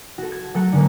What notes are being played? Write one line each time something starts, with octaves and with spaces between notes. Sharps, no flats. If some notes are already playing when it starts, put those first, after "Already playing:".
F#4 A4
G#6
F#3 A3 A4 F#5 C#7
D3 G#3 A#3